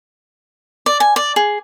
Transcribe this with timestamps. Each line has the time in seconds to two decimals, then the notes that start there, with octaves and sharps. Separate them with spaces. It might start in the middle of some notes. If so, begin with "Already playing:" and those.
0.86 D5
1.00 G#5
1.16 D5
1.36 G#4